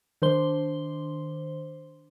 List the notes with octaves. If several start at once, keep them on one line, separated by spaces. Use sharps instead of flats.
D#3 D4 C5 C6 G7